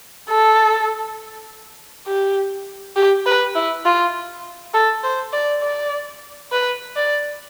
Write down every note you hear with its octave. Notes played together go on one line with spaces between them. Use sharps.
A4
G4
G4
B4
E4
F4
A4
C5
D5
D5
B4
D5